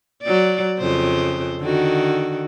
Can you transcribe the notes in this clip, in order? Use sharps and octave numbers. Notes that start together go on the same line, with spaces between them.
F#3 D5
F2 C#3 C5
D3 D#3 F#4